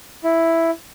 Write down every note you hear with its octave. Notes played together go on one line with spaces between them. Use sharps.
E4